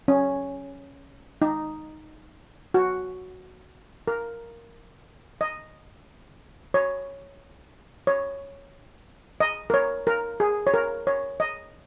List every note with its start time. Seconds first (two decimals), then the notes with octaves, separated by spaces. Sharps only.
0.08 C#4
1.42 D#4
2.74 F#4
4.08 A#4
5.41 D#5
6.74 C#5
8.07 C#5
9.40 D#5
9.70 A#4
9.74 C#5
10.07 A#4
10.40 G#4
10.67 C#5
10.74 A#4
11.07 C#5
11.40 D#5